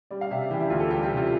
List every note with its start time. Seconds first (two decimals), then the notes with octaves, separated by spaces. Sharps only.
0.11 G3 D5
0.21 F5
0.31 C3 E5
0.41 D5
0.50 E3 G4
0.61 E4
0.70 D2 F4
0.80 A4
0.90 G3 G4
1.03 G4
1.10 C3
1.17 F4